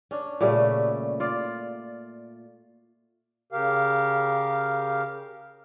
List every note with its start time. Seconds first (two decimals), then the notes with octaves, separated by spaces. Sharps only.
0.11 C#4 D4
0.41 A#2 C#3 G3 A3
1.20 F4 D5
3.52 C#3 G4 A#4 F5